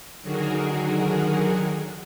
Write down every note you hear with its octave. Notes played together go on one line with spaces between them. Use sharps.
D3 D#3 F#3 F#4 G#4 A#4